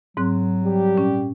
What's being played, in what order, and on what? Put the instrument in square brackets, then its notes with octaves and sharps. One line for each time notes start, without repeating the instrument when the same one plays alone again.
[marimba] G#2 C4 F#6 [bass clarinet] F#3
[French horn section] G3 G4
[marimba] A#2 C#4